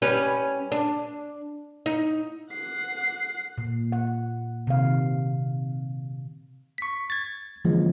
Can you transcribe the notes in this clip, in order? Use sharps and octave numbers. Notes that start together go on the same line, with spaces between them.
G3 C#4 B4
D4
D#4
F#5 C7
A#2
F#5
C3 D#3 F5
C#6 B6
G#6 A6
D3 E3 F3 G#3 A#3 C#4